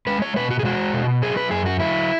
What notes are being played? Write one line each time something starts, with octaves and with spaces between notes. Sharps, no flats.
G#3 B4
C#5
B2 B4
F#4
G#4
G#3 F#4
B2
F#3 G#4
B4
F#2 G#4
F#4
F#3 E4